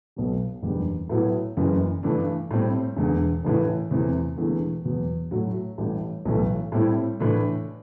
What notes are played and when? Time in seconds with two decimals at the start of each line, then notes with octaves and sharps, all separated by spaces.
0.16 B1 B2 F#3
0.62 F#1 E2 D3 G3
1.09 A2 F#3 B3 E4
1.57 F#1 F#2 E3
2.03 G2 E3 A3 D4
2.51 A2 G3 C4
2.97 E1 E2 D3
3.44 A1 A2 E3
3.91 E2 C3 E3 A3
4.37 E1 E2 D3 A3 E4
4.85 E2 B2 F#3
5.31 A2 F#3 A3
5.78 A1 A2 G3
6.25 B1 A2 E3 A3
6.72 A2 G3 C4 E4
7.20 A2 E3 A3 D4